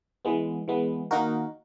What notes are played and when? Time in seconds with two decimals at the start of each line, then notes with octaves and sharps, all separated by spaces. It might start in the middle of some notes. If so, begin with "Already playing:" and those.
0.25 E3 G#3 B3
0.68 E3 G#3 B3
1.11 D#3 A#3 D#4 F#4 A#4